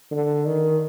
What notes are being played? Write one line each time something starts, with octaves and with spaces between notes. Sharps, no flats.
D3
D#3